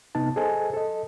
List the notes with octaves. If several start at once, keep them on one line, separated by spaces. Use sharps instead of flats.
C3 B3 D#4 A5
G#4 A4 C5 D#5 G#5 A5
A4 D#5